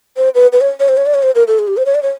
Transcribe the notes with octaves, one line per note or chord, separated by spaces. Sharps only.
C5
B4
B4
C#5
C#5
C5
C#5
D5
C#5
C5
A#4
A4
G#4
G4
C5
C#5
D5
C#5